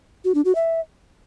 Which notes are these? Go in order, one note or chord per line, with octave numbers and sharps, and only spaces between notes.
F#4
D4
F#4
E5